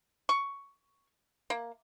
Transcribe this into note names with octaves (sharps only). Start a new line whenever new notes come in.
C#6
A#3